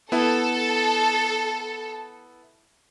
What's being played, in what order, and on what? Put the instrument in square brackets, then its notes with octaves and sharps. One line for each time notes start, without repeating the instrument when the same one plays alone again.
[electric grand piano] B3 E4 [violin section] A4